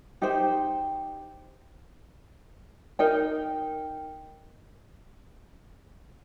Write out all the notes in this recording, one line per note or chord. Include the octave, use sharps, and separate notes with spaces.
D#4 G4 C5 G5
D#4 A#4 D#5 G5